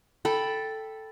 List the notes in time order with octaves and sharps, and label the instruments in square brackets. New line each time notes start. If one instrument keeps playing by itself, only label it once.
[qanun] A4 G5 B5